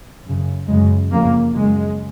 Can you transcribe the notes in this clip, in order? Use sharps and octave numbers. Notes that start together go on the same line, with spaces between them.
F#2 C#3
F#2 C#3 G#3
F2 C#3 A#3
F#2 C#3 G#3